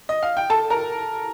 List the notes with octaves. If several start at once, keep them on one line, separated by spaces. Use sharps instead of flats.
D#5
F5
G5
A4 A5
A#4 A#5